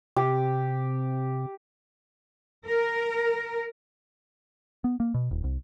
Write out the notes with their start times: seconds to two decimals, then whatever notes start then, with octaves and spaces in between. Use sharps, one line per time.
0.16 C3 G4
2.66 A#4
4.84 B3
5.00 A#3
5.14 B2
5.31 D#1
5.44 C2